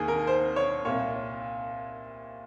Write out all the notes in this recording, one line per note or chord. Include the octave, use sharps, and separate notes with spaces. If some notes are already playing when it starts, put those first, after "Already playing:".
Already playing: D#2 D#3 G#4
A#4
C5
C#5
C2 A#2 C#5